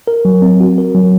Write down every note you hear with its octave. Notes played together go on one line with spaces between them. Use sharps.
A#4
F#3
C4
F#4
A#4
F#3